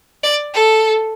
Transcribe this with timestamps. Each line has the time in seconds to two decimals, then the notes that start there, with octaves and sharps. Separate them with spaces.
0.23 D5
0.54 A4